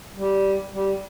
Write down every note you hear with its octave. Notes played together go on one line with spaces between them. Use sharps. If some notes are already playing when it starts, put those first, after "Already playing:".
G3
G3